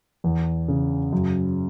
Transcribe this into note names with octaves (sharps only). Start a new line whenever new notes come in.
E2
C#3
F#2